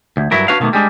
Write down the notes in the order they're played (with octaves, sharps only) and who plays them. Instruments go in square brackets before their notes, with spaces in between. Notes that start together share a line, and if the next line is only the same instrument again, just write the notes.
[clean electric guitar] D2
G2 F#3 E4 A#4
D4 F#4 B4 C#5 F5
B2 D#3 E3 A3 A#3
G3 G#3 D4